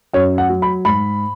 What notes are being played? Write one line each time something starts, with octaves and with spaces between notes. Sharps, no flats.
F#2 C#5
F#5
F#3
B5
G#2 B5